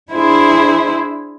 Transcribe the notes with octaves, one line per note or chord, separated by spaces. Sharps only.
D4 E4 G#4 C5 E5